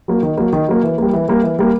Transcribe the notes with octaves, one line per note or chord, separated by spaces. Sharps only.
F#3 A#3
D#3
F#3 A#3
D#3
F#3 A#3
E3
G3 A#3
E3
G3 A#3
E3
G3 A#3